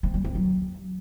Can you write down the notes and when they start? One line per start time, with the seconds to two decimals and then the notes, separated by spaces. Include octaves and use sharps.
0.03 C4
0.14 G3
0.24 C4
0.35 F#3